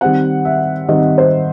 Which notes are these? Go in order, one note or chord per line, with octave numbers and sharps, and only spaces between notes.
D#3 G3 C4 F#5
E5
D#3 G3 C4 D#5
C5